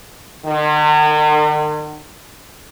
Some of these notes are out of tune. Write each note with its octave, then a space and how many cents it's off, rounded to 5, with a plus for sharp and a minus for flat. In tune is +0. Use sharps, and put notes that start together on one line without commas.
D#3 -45